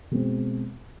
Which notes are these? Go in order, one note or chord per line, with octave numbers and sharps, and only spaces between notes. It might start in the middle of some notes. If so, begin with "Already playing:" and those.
B2 G#3 C4